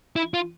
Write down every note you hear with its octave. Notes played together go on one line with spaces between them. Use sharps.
E4
F4